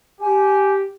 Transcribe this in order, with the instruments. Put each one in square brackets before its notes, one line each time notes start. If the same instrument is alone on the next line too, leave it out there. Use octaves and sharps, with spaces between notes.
[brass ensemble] G4 [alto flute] G#5